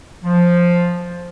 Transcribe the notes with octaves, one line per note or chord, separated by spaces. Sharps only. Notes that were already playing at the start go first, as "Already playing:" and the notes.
F3